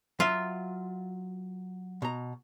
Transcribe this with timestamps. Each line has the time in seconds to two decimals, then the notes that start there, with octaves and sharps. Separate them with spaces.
0.20 F#3 F4 E5
2.02 B2 A#5